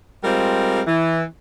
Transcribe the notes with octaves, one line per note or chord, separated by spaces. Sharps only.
G3 G#3 C4 F4 A#4
E3